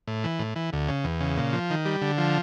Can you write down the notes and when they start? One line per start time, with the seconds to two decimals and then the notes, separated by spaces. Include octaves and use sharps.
0.07 A2
0.24 E3
0.39 A2
0.56 E3
0.73 D2
0.88 C#3
1.04 E2
1.20 C#3
1.37 A#2
1.53 F3
1.70 D#3
1.85 G3
2.02 D3
2.18 F3